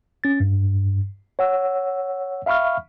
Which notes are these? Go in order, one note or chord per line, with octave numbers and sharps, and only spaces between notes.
C#4 A6
G2
C#5 F#5 E6
E5 F5 B5 C#6 F6